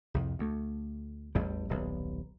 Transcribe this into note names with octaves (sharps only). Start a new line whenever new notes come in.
C2 F2
D2 A3
A1 E2 G3
D#1 B1